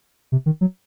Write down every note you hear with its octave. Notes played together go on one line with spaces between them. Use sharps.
C3
D#3
F#3